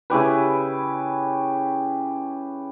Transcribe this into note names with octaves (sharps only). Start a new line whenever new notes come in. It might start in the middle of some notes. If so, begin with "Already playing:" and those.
C#3 E4 G4 B4